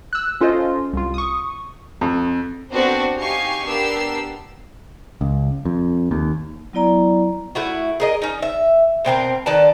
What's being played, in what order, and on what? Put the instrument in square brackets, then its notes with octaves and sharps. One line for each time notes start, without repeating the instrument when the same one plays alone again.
[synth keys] E6 F#6
C#4 F4 A4 C5 D#5
C2 F4
C#6 D#6
[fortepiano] F2
[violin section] B3 C4 D4 F#4 A4 C5
D#4 G4 F5 G#5 C#6 C7
B3 D4 G4 A#4 E6 C7
[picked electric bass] C#2
F2
D#2
[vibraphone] F#3 B3 E4 D5 A#5
[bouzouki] A3 E4 F#4
G#4 A#4 D#5
C#4 D#4
E5
B2 C4 G4 A#4
D#3 B4 D5 A5